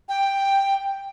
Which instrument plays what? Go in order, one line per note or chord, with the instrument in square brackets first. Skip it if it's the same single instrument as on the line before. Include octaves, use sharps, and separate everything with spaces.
[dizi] G5